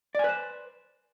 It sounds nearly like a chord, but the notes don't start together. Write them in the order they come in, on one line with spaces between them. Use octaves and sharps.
D5 G#5 B4 C5